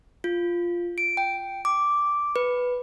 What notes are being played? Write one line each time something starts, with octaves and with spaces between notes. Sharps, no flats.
F4
D7
G5
D6
B4